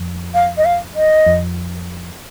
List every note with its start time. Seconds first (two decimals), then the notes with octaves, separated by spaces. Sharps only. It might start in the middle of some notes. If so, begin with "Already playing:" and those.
Already playing: F2
0.34 F5
0.57 D#5
0.65 F5
0.96 D#5
1.26 F2